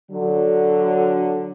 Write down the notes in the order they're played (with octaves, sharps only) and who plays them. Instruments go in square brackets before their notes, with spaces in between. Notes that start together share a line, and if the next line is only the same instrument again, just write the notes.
[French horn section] D3 F#3